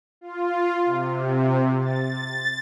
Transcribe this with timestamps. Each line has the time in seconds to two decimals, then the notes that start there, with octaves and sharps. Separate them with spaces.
0.21 F4
0.85 C3
1.80 A6